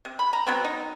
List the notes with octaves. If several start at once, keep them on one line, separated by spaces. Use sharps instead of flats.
C3
B5
A#5
F#3 B3 C4
D#4